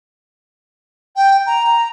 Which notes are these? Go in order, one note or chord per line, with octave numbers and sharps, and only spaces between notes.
G5
A#5